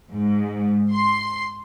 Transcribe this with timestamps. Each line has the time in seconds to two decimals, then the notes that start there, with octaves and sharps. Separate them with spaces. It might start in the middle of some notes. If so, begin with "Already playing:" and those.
0.11 G#2
0.92 C6